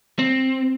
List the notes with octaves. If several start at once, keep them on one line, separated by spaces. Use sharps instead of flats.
C4